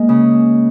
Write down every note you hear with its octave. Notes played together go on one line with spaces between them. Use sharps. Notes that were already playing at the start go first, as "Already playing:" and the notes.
Already playing: G#3 A#3
C#3